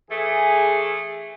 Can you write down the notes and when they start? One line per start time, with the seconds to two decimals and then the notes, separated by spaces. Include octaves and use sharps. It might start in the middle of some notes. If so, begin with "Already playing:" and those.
0.11 E3 A3 G#4